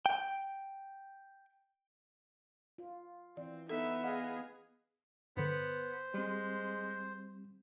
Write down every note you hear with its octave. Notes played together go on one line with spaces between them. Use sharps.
G5
F4
E3 C4 D5
B3 D#4 A4 E5
G#4 D#5 F5 F#5
G2 D3 B3 C5
G3 G#3 C4